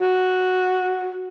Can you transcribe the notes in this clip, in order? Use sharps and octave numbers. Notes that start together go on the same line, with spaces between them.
F#4